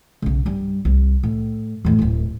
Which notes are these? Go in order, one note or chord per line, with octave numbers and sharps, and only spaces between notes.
B1 C#3
G2 G3
C2
A2
E2 A2
D1 A1